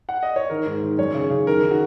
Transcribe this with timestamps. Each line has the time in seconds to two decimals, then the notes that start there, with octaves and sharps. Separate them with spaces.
0.09 F#5
0.23 D#5
0.36 C#5
0.50 D#3 A#4
0.66 G#2
0.83 D#3
0.98 F#2 C#5
1.14 C#3
1.30 C#3
1.47 D#3 A#4
1.62 D#3
1.71 F#4